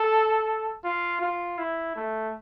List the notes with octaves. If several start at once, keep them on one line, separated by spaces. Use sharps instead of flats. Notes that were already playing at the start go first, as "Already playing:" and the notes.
Already playing: A4
F4
F4
E4
A3